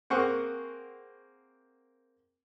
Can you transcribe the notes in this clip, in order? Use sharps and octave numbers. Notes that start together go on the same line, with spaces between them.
A#3 C4 G#4 C5 F#5 C#6